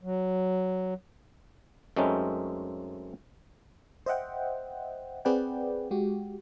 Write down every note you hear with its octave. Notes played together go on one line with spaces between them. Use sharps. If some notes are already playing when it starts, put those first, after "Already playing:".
F#3
F#2 G#3 A3 C4 C#4 D#4
C5 D#5 E5 F#5 G5
C4 G#4 B4 D5 F#5 G5
G#3 F#4 G4